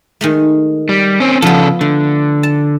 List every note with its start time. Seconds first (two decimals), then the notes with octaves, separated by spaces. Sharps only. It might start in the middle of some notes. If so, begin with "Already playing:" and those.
0.21 D#3 G#3 A3
0.89 G3
1.20 C4 C#4
1.42 C#3 F3 B3 A4
1.81 D3 A3
2.43 A5